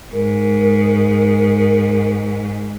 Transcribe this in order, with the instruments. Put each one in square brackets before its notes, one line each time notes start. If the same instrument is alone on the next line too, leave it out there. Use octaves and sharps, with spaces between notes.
[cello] G#2 [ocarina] A#4